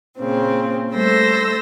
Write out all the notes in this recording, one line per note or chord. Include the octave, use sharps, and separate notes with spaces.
A#2 C#3 C4
G3 A3 A4 C5 E6 A#6